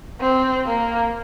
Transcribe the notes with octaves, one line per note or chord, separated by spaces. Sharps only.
C4
A#3